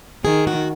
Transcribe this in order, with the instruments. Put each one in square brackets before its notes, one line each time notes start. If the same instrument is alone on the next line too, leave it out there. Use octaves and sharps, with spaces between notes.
[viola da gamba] D#3 [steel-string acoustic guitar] G#4
[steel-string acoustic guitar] F#4